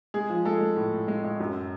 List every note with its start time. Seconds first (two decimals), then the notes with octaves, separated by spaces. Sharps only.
0.14 G#3 G#4
0.30 F3
0.45 G#3 A4
0.61 G#3
0.76 A2
0.92 A2
1.08 G#3
1.24 G#3
1.40 F#2